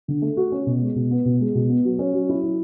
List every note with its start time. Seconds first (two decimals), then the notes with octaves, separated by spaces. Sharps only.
0.08 D3
0.22 A3
0.37 F#4
0.52 C#4
0.66 B2
0.82 G#3
0.95 B2
1.11 B3
1.25 B2
1.40 G#3
1.55 B2
1.69 B3
1.85 F#3
1.99 C#4
2.14 F#3
2.29 E4
2.43 F#3